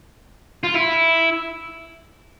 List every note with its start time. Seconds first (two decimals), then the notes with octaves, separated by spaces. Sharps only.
0.63 F4
0.74 E4